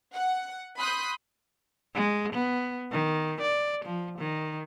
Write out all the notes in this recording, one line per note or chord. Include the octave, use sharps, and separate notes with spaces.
F#5
B5 C6 D#6 F#6 G6
G#3
B3
D#3
D5
F3
D#3